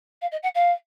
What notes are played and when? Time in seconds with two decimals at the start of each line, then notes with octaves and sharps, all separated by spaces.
0.21 F5
0.31 D#5
0.42 F#5
0.54 F5